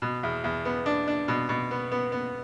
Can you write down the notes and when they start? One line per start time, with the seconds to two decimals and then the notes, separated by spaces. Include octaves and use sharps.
0.02 B2
0.23 E2
0.44 E2
0.65 B3
0.86 D4
1.08 D4
1.28 B2
1.49 B2
1.71 B3
1.92 B3
2.12 B3